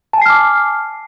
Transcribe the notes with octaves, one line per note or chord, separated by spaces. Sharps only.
G#5 A5 D6 F6 C7